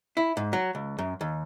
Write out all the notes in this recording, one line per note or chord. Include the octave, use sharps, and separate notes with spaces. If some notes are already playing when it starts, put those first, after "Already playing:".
E4
G#2
F#3
C#2
F#2
D#2